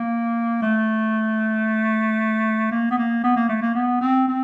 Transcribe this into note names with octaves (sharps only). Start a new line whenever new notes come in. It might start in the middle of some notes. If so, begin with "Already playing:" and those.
Already playing: A#3
A3
A#3
B3
A#3
B3
A#3
A3
A#3
B3
C4
C4